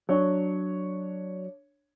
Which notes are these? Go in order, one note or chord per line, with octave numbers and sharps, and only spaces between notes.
F#3 D4 C#5